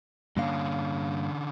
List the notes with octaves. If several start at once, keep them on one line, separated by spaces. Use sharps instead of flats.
G2 D3 A#3 C#4 F5